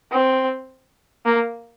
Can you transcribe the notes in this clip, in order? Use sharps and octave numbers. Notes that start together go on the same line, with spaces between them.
C4
A#3